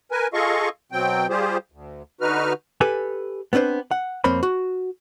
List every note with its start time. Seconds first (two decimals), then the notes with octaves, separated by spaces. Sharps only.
0.11 A#4 B4 G#5
0.34 F4 G#4 A4 D#5 F5 C#6
0.92 B2 F#3 C4 G5
1.29 G3 F4 G4 G#4 C5
1.72 D2
2.21 D3 D#4 F#4 B4 F6
2.81 G4 A4 B4 G#5
3.53 B3 C4 D4 B4 C5
3.91 F#5
4.24 F2 A#3 C4 C#5 B5
4.43 F#4